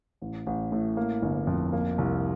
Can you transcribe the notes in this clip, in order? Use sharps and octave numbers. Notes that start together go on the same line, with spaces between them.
A1
A1
A2
A#3
G1
F2
A#3
C2